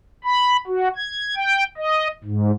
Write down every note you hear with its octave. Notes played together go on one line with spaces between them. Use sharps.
B5
F#4
G#6
G5
D#5
G#2